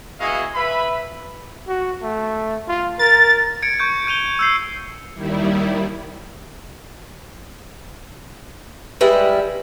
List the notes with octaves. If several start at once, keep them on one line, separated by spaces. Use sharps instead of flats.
B3 E4 F#4 G#4 D#5 F5
B4 E5 B5
F#4
A3
F4
A#4 A6
G#6 C#7 D7
C#6 G6 D7
G6 D#7 F7 G7
E6 G6 C7
D#2 D#3 G3 E4
G3 G#3 E4 B4